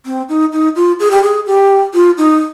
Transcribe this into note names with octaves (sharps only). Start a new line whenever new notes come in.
C4
D#4
D#4
F4
G#4
G4
G#4
G4
F4
D#4